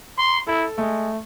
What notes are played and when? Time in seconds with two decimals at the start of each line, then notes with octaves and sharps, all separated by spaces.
0.18 C6
0.47 E4 A4
0.78 G#3 A3